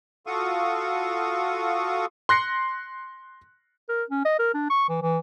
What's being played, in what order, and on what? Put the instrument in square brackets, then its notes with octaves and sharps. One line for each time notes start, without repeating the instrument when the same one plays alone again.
[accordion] F4 F#4 A4 F5 C#6 D#6
[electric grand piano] C6 F#6 A#6 C7 C#7
[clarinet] A#4
C#4
D#5
A#4
D4
C#6
E3
E3